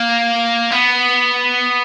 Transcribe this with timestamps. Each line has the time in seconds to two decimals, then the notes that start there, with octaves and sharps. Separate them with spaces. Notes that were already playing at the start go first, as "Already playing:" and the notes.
Already playing: A#3
0.71 B3